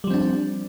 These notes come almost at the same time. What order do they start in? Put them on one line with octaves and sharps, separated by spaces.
G3 F3 C4 D4